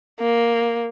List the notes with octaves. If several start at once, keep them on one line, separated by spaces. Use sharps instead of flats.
A#3